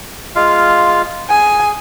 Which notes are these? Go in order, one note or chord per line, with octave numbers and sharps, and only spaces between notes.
G#3 F4 F5
G#4 G#5